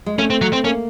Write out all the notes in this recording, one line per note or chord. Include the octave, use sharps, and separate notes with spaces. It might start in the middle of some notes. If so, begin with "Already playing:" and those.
G#3
A3 C#4
C4
F#3
C4
A#3 C#4